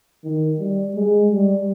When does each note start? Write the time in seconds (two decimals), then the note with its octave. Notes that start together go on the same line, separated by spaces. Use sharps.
0.24 D#3
0.59 G3
0.95 G#3
1.32 G3